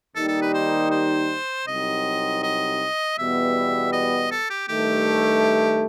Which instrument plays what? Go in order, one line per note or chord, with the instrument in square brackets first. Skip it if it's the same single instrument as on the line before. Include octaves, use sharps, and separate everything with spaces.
[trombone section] D#2 D#3 G3 D#4 [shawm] A4
[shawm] A4
B4
C5
C5
[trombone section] C2 C3 F#3 C4 D#4 [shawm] D#5
[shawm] D#5
[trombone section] E2 B2 G3 B3 [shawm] E5
[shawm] D#5
A4
G4
[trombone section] G2 D#3 A3 [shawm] G4